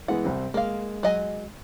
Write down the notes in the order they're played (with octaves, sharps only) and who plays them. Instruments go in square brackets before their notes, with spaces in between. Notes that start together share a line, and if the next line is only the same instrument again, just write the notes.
[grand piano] E3 G#3 B3 [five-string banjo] F#5
[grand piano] C2 C4
[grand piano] G#3 [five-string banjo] A#3 F5
[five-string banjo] F#3 D#5 G#5